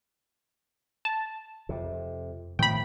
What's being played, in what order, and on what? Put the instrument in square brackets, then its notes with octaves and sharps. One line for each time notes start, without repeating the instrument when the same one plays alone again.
[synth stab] A5
[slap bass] F2 C3
[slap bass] A2 D#3 F3 [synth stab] G5 B5